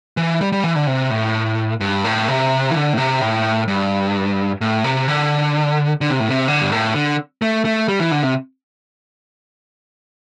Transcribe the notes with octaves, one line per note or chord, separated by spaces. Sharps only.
E3
G3
G3
E3
D3
C3
A2
G2
A2
C3
E3
D3
A2
C3
A2
G2
A2
C3
D3
D3
C3
A2
C3
D3
G2
A2
D3
A3
A3
G3
E3
D3
C3